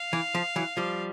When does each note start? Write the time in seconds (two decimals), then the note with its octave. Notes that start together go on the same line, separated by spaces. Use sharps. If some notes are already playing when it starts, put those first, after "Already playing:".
Already playing: F5
0.13 E3
0.35 F3
0.56 E3 F#3
0.77 F3 G3